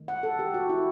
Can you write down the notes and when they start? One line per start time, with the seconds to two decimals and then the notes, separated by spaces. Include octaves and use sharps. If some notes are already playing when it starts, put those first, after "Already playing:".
Already playing: D#3 A3
0.08 F#5
0.23 A4
0.39 G4
0.54 F#4
0.69 E4